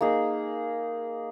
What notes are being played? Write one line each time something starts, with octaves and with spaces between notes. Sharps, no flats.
A#3 D#4 G#4